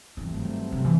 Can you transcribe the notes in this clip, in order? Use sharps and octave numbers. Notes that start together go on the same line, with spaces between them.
G2 E3 F#3 A3 C4
E3
D#3
C3
E3